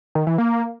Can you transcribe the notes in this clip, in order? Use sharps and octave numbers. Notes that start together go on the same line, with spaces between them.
D#3
E3
A#3